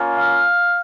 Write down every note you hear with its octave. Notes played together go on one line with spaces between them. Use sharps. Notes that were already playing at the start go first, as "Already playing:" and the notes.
Already playing: A#3 C#4 F4
F5